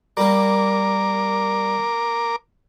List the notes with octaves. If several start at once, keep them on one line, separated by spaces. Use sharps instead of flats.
G3 A#3 A#4 D6